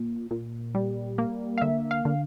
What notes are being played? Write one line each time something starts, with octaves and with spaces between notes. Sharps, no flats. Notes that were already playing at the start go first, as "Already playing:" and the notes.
Already playing: A#2
A#2
G3
A#3
F5
D3 E5
F5
D3